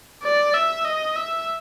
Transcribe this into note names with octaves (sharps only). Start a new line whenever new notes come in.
D5
E5
D#5
E5